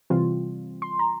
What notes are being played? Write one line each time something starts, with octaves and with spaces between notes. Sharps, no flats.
C3 E3 G3 C4 F4
C6
A#5